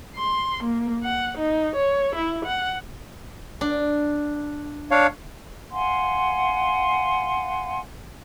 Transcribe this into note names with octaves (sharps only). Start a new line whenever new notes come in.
C6
A#3
F#5
D#4
C#5
E4
F#5
D4
D4 C#5 F5
F5 F#5 G#5 C6